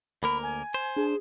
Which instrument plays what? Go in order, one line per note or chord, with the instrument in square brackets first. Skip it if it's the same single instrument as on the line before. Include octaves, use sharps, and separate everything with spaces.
[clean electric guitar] D2 A#3 A#4 [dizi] B5
[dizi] G#5
[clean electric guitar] C5
[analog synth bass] D4 [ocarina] G#4